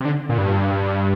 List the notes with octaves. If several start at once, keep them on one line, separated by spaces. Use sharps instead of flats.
C3
D3
A#2
G2